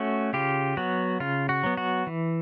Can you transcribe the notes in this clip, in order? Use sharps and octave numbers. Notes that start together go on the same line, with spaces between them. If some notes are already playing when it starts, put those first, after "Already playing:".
Already playing: A3 C#4 F#4
C#3 F4 G4
F#3 B3 F#4
C#3 F4
F#4
F#3 B3
F#4
E3